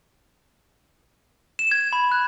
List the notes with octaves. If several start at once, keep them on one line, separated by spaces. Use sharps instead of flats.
E7
G#6
B5
F#6